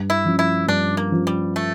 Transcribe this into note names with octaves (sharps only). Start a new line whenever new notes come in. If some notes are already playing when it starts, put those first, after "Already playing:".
Already playing: G2
E4
F3 C#4
E4
G2 D4
A#3
F3 C#4
G3
A3